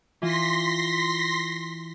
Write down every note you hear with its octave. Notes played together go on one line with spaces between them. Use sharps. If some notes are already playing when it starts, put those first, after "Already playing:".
E3 F4 C6 A#6 B6